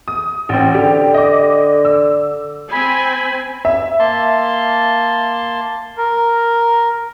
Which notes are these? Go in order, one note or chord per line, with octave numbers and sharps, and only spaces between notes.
D#6
A1 C4
D3 G4
D#5 D6
E6
C4 G#5 B5
E5
A#3 A5 C6
A#4